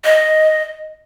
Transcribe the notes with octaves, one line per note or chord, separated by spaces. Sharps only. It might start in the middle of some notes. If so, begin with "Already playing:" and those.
D#5